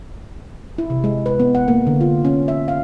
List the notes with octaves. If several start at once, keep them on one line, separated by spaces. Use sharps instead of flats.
E4
C3
G#3
B4
B3
F#5
A#3
D3
F4
C#4
E5
F5